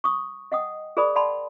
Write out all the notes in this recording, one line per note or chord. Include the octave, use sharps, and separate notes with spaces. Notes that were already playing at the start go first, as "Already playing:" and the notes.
C#6 D#6
D#5 F#5 G5 D#6
G#4 A#4 C5 D5 B5 D#6
D5 F#5 G5 A5 B5 C6